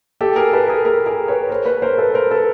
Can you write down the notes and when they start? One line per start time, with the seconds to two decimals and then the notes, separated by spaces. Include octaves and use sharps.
0.21 G4 A4
0.36 G#4 A#4
0.53 A4 B4
0.68 G#4 A#4
0.85 G#4 A#4
1.06 G#4 A#4
1.28 B4 C#5
1.49 A#4 C5
1.66 B4 C#5
1.82 A#4 C5
1.98 A4 B4
2.14 A#4 C5
2.31 A4 B4